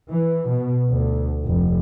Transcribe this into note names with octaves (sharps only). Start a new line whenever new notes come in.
E3
B2
D2
F1